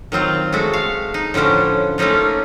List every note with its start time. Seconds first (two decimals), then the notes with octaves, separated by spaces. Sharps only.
0.12 D#3 F#3 C4 F4
0.52 G#3 A3 F#4
0.73 F5
1.14 D#4
1.34 A2 D3 F3 C#4 D4
1.98 A3 A#3 C#4 D#4 F4